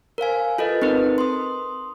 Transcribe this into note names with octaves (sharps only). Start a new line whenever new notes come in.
A#4 C5 F5 G#5
F4 A4 B4 D#5
C4 D#4 A#4 B4
C6 D#6